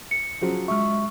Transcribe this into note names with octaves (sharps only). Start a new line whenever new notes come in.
C#7
C#3 F3 F#3
G#3 E5 C#6 E6 F6